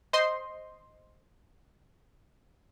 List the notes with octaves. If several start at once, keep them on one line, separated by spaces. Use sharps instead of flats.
C5 D#5 C6